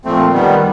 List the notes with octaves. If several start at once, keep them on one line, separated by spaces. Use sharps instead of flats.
A#2 F3 A3 C4
D#3 G3 B3